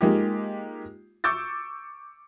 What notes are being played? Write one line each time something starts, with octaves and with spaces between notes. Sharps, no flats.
G#3 A#3 D#4 F4 G4
C#6 D6 E6 G6 A6